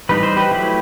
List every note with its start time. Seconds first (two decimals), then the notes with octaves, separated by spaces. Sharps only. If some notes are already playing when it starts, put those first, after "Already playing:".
0.09 E3 G3 D#4 B4
0.23 C5
0.37 G4 B4
0.51 F#3 A3 E4